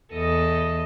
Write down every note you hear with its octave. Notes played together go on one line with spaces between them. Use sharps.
E2 A4 D#5